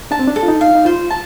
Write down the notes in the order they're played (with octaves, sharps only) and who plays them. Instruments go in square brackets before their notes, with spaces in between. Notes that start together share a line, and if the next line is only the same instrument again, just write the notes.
[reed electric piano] D4 [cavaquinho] A5
[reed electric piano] C4
D4
[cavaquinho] A4
[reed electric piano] F4
D#4
[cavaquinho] F5
[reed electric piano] D#4
[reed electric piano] F4 [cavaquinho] C5
[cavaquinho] A5